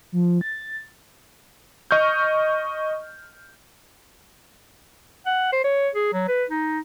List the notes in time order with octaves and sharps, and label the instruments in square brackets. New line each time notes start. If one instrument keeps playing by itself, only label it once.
[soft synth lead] F3
A6
[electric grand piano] D#5 C#6 F6 G6
[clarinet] F#5
C5
C#5
G#4
F#3
B4
D#4